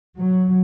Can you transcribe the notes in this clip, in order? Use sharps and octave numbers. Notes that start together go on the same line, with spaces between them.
F#3